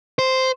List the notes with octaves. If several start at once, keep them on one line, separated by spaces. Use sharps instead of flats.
C5